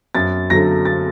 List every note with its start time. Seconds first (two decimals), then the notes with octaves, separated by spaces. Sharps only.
0.15 F#2 A6
0.50 D3 F#3 A#6
0.85 A6